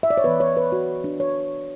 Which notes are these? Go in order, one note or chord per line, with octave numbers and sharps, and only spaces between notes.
E5
D5
C#5
E3 B3 B4
C#5
B4
F#4
D4
C#5